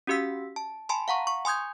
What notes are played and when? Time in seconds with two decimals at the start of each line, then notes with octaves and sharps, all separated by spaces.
0.07 C#4 F#4 G4 F5 E6 B6
0.56 A5
0.89 G#5 A5 B5 C6
1.08 F5 F#5 A#5 C#6
1.27 C#6
1.45 G#5 C6 D#6 G6 G#6